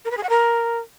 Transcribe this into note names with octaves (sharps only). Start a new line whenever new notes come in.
A#4
B4
G#4
F#5
A#4